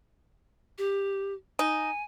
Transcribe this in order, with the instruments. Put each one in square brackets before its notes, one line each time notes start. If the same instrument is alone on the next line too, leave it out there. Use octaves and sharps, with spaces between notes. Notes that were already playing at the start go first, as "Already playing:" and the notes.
[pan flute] G4
[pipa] D#4 [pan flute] G#5